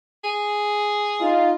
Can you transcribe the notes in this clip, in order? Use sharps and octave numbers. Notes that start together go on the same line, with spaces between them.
G#4
D#4 F4